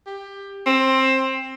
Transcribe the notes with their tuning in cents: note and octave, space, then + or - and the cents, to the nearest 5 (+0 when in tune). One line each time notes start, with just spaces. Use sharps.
G4 +20
C4 +15